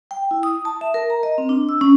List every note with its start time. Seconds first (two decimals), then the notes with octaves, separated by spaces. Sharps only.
0.11 G5
0.31 E4
0.43 D#6
0.65 A5
0.81 E5
0.94 A#4
1.10 A#5
1.23 D#5
1.38 C4
1.49 D4
1.69 E6
1.81 C#4